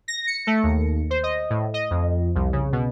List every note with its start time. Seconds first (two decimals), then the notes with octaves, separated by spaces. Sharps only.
0.08 A#6
0.27 C#7
0.47 A3
0.63 D#2
1.10 C5
1.23 D#5
1.50 A2
1.74 D#5
1.91 F2
2.35 C2
2.53 C#3
2.73 B2